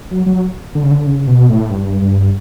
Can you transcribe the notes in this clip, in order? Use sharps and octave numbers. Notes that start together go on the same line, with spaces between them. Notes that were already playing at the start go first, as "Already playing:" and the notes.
F#3
F#3
D3
C#3
D3
C#3
B2
A2
G2
G2